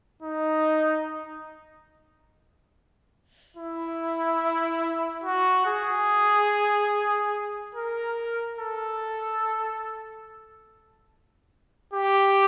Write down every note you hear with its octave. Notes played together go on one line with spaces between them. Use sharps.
D#4
E4
F#4
G#4
A#4
A4
G4